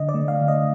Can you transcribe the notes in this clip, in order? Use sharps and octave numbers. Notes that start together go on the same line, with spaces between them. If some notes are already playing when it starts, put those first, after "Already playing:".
Already playing: D3 D#5
D5
A3
F5
D3
D#5